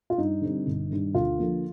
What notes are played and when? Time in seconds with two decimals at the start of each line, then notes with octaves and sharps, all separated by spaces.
0.10 F4
0.18 G2 D#4
0.42 D3 G3 C4
0.67 G1
0.91 G2 D#3
1.15 D2 F4
1.39 D3 F3 A#3